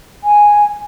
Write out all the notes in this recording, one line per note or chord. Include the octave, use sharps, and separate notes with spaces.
G#5